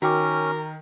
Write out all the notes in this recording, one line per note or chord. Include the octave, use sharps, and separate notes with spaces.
D#3 C#4 F#4 A#4 G5 D6